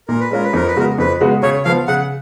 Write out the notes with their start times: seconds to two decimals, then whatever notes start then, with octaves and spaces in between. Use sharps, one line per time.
0.08 A#2 A#4
0.20 B4
0.31 G#3 C#4 F4 A#4
0.44 B4
0.53 F2 A#4
0.67 B4
0.76 C#3 G#3 B3 F#4 A#4
0.98 F2 B4
1.21 C#3 G#3 B3 F#4
1.43 C#3 C#5
1.65 F3 B3 F5
1.87 C#3 F#5